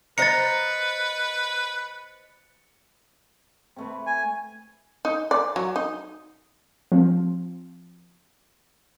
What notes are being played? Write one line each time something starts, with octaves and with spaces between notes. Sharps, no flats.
B4 C5 D#5 A#5 A6 C#7
C3 A3 B4
G#5
D#4
D5
F#3
D#4
F3 C4